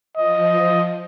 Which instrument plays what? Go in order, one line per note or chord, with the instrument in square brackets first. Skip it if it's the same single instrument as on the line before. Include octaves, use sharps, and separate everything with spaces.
[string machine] F3 [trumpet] D#5